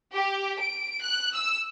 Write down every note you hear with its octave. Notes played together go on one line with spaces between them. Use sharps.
G4
D7
F#6
E6